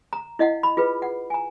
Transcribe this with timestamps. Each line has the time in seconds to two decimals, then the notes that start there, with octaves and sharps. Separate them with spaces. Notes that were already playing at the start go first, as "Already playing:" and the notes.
0.13 A#5
0.39 E4 D#5 F5 F#5
0.63 B5
0.77 F4 G#4 B4
1.02 F#5
1.30 G#5 A#5